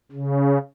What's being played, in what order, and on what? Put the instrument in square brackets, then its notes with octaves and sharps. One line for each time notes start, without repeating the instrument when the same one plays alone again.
[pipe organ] C#3